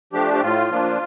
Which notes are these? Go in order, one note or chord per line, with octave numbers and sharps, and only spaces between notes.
F3 A3 D4 G4
G4
A2 F4
F3 A#3 D4